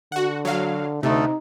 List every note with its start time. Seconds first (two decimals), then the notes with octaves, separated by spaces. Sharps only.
0.12 D3 F#4 F#5
0.45 F#3 F5
1.03 D2 C3 A3 D#4